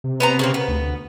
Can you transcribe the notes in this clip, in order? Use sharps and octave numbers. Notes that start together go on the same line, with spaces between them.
C3
B3 C5 A#5
C#3 A#3 C4
B3
D2